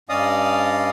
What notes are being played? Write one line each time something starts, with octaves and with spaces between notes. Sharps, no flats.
G2 C#4 D5 D#5 F5 D#6